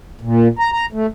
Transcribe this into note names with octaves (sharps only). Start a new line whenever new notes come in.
A#2
A#5
A#5
A3